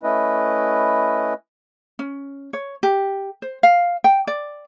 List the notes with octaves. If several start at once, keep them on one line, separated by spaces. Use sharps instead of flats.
A3 C#4 E4 B4 D#5
C#4
C#5
G4
C5
F5
G5
D5